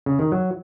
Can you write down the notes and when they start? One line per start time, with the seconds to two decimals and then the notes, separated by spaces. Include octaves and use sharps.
0.06 C#3
0.19 D#3
0.32 F#3